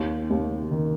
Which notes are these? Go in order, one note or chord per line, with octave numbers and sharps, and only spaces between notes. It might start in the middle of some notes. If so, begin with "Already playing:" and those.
Already playing: D#2
D#2
D#3